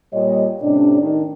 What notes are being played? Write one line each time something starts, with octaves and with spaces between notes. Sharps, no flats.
A#2 G3 C#5 D#5
A2 C3 C#4 D4
D#3 D4